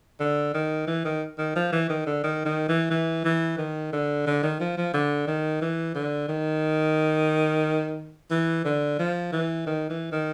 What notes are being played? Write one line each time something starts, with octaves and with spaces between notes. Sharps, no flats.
D3
D#3
E3
D#3
D#3
F3
E3
D#3
D3
D#3
D#3
E3
E3
E3
D#3
D3
D3
D#3
F3
F3
D3
D#3
E3
D3
D#3
E3
D3
F3
E3
D#3
E3
D#3